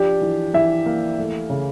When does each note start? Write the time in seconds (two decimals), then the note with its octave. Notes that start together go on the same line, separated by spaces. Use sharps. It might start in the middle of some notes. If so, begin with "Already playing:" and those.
Already playing: F3 D4 G4
0.21 E3
0.54 E3 E5
0.86 A#3
1.19 A3
1.50 C#3